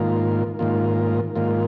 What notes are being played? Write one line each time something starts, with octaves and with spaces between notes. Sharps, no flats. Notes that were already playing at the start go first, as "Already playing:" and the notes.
Already playing: G#2 D#3 A#3 F4
G#2 D#3 A#3 F4
G#2 D#3 A#3 F4